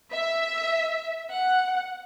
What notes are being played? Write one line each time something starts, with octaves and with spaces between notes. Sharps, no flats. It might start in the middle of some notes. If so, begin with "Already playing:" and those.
E5
F#5